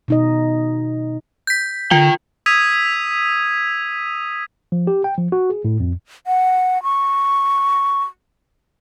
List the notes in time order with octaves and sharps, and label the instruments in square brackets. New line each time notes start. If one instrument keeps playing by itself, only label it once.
[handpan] B2 D#4 D#5
[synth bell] G6 B6
[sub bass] D3 [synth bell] F4 [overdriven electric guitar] A#4 G5
[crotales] D#6 E6 G#6 B6 D#7 F7
[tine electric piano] F3
G4
G5
F3
F#4
G#4
A2
F2
[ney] F#5
C#6